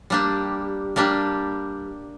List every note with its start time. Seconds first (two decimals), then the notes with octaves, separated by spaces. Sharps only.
0.10 G3 A#3 D4 G4
0.96 G3 A#3 D4 G4